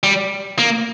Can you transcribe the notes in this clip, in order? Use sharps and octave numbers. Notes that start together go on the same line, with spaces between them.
G3
A#3